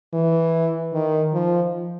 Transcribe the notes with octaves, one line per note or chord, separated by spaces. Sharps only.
E3
D#3
F3